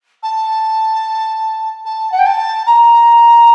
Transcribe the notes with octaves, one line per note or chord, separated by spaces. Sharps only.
A5
A5
F#5
G5
A5
A#5